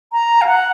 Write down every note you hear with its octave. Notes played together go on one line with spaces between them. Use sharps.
A#5
F5
F#5